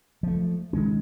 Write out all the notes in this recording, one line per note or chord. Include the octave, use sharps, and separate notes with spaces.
F3 A3
D#3 G#3 C#4